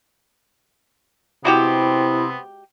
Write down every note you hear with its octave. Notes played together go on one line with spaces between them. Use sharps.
C3 G#3 B3 C4 E4 F#4 G4